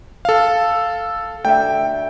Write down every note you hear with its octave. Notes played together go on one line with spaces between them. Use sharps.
A4 F5
D2 A4 E5 G5